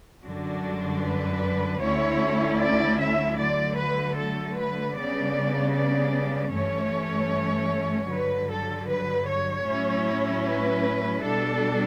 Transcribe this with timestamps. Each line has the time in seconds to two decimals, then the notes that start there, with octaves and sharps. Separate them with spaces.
0.24 F#2 D3 G3 D4 F#4
1.03 B4
1.81 D2 D3 A3 C#4 E4 C#5
2.59 D5
2.99 E5
3.38 D3 F#3 A3 D5
3.77 B4
4.16 A4
4.55 B4
4.95 C#3 G3 B3 D4 D5
5.74 D5
6.52 G2 E3 A3 C#4 C#5
8.08 G2 D3 F#3 B4
8.48 A4
8.87 B4
9.26 C#5
9.65 A2 F#3 C#4 E4
10.44 B4
11.23 B2 G3 D4 A4